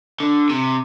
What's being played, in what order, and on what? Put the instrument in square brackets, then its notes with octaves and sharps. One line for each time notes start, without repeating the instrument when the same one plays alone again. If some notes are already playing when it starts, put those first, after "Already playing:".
[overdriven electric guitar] D3
C3